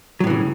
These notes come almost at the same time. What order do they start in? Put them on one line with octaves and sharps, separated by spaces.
F#3 A2 E3 C#3